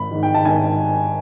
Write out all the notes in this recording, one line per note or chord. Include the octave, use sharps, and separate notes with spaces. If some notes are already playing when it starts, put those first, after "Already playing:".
Already playing: G#1 B5
G#2 D#3
G5
A5
G#1 G#5